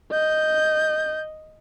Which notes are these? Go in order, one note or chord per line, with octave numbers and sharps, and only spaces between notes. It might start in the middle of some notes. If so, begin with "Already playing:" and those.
D#5 G6